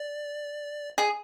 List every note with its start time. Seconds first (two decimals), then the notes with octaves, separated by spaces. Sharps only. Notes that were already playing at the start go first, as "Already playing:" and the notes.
Already playing: D5
0.98 G#4